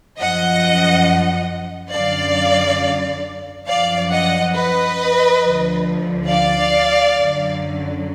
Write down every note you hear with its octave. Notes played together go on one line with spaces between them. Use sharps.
F#2 F3 D#5 F#5
F#2 D3 F#3 D5 F5
F#2 F3 D5 F5
D#5 F#5
B4 D#5
D2 D3 F3
D5 F5
F#2 D3 F#3